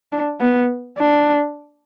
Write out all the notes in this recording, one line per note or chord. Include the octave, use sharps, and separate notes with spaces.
D4
B3
D4